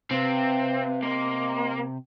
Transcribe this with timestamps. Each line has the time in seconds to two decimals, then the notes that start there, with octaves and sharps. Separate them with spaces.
0.11 C3 C4 B4 F5
1.03 A#3 D#5 C6